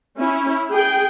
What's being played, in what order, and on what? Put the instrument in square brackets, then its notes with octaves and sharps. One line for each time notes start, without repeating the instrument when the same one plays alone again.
[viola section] C#4 E4
G#4 G5